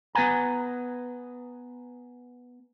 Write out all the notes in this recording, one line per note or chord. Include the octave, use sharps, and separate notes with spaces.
B3 B4 F#5 G#5 A#5